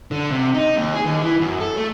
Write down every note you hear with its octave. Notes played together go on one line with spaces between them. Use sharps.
D3
C3
D#4
D#2
G#4
D#2
E3
F#2
A4
A3